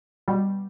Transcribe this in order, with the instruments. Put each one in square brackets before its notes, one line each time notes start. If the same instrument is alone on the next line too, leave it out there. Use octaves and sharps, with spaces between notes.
[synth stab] B2 G3